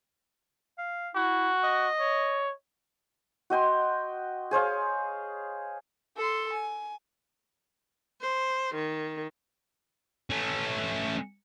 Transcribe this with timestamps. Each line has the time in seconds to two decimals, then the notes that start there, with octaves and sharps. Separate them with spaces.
0.78 F5
1.16 E4 F#4
1.64 D#5
1.99 C#5
3.50 F#4 D#5 G5 C6
4.51 G#4 C5 C#5 F5
6.17 A4 C6
6.52 G#5
8.21 C5
8.74 D#3
10.30 A3 C#4